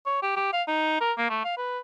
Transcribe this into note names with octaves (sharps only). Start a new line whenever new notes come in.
C#5
G4
G4
F5
D#4
A#4
A#3
A3
F5
B4